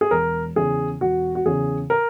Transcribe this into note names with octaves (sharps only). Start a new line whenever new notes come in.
G#4
E1 A#4
E2 C#3 G#4
E1 F#4
F#4
E2 C#3 G#4
A#4